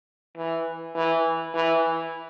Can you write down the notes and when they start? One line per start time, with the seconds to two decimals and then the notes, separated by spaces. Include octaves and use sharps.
0.37 E3
0.96 E3
1.55 E3